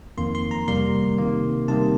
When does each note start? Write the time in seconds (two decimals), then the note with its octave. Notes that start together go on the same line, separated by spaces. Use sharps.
0.18 F2 D#3 A#3 C6
0.35 C6
0.51 A#5
0.68 C3 G3 A#3 C6
1.18 C3 D#3 A#3
1.68 C3 D#3 G3 A#3 A5